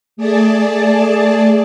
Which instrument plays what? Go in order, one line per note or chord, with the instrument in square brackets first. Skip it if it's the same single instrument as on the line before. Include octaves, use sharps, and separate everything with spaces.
[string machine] A3 G#4 D5 A5